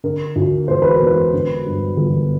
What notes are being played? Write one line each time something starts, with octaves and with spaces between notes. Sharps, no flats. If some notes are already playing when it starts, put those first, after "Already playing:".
D3 A#4
D2
E1 C5
B4
A#4
E1
B4
D3
G2
G1